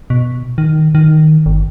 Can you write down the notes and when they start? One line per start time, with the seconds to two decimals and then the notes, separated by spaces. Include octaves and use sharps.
0.10 B2
0.58 D#3
0.95 D#3
1.46 G1